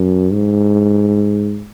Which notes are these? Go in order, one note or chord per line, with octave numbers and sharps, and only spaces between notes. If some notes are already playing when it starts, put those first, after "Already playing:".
Already playing: F#2
G#2